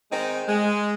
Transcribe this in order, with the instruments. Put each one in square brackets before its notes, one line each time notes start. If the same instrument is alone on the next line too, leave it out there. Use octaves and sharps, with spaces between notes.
[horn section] D#3 G#3 C4 D#4
G#3